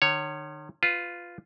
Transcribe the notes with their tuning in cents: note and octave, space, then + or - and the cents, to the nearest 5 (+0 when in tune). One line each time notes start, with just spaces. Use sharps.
D#3 -45 C#5 +0
F4 +0 B4 +20